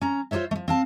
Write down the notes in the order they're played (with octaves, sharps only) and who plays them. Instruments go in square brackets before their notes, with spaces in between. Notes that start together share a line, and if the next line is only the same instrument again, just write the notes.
[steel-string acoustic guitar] C#4 A#5
F4 G#4 C5 C#5 E5
F3 A3
C4 F5 A5